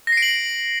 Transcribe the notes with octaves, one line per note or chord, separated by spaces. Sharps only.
A#6
C7
D7
F#7